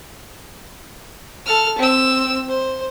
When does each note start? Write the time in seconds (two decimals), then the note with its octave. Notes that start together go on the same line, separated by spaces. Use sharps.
1.46 A4 F6
1.79 C4 E6
2.49 C5